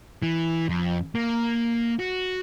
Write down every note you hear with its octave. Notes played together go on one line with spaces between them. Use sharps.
E3
F2
A#3
F#4